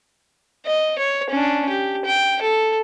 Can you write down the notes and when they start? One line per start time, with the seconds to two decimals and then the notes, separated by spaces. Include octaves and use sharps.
0.66 D#5
0.99 C#5
1.30 C#4 D4
1.69 G4
2.05 G5
2.42 A4